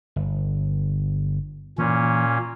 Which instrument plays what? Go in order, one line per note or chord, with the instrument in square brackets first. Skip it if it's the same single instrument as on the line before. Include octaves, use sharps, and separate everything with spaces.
[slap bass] G1
[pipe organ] A#2 C#4 [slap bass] E3 A#3